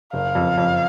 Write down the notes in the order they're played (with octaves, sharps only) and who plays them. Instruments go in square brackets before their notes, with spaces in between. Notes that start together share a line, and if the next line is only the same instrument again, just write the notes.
[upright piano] F#1 [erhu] F5
[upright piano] F2
F2